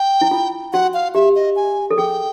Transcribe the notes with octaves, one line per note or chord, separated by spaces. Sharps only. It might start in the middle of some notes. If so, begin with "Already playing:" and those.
Already playing: G5
E4
F4
F#4 F#5
F5
G4 E5
D#5
G#5
A4
G#4 G5